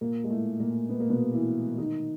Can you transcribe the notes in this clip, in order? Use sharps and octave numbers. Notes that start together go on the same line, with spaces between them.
A#2 A#3
G#3
A2 A3
A#2 A#3
B3
A#3
B2 B3
E3 E4
D#3 D#4